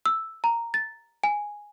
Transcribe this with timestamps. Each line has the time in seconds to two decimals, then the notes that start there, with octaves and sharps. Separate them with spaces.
0.06 E6
0.44 A#5
0.74 A6
1.24 G#5